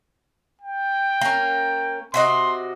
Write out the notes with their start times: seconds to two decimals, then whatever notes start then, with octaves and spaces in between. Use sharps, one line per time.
0.61 G5
1.21 A#3 C#4
2.14 C3 F#4 D#5 C6